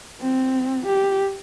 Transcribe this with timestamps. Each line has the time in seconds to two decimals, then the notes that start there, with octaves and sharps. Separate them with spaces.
0.20 C4
0.86 G4